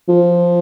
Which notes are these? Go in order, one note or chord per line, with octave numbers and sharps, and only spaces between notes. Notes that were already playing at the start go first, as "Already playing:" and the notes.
F3